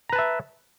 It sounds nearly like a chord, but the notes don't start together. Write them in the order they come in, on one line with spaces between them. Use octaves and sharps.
A#5 B4 A5 E5